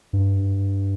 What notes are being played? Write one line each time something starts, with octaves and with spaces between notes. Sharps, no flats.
G2